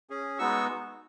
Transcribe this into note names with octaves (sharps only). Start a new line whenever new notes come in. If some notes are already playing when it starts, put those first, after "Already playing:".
C#4 G#4
G#3 B3 D#4 F#4 C#6 E6